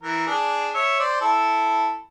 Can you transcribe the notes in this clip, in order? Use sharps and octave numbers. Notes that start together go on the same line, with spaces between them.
E3 A#4
D4 G#4
C#5 E5
C5 D5
E4 A4